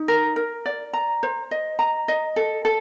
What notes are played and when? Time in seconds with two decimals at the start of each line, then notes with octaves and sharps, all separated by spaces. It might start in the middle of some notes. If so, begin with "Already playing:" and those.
Already playing: D#4
0.08 A#4
0.36 A#4
0.66 D5
0.93 A#5
1.23 C5
1.51 D#5
1.79 A#5
2.08 D#5
2.36 A4
2.65 A4